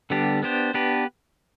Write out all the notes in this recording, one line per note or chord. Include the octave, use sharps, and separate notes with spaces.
D3 G3 B3 D4 G4
B3 D4 G4 C5
B3 D4 G4 B4